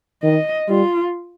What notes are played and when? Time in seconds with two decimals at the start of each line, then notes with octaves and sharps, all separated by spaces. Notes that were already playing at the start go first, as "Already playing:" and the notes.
0.23 D#3 D#5
0.69 G3 F4